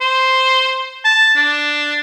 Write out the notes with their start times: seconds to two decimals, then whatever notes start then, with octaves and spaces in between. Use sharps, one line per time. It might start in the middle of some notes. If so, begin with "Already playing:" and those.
0.01 C5
1.05 A5
1.36 D4